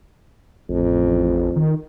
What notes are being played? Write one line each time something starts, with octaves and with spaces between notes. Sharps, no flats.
A1 F2
D#3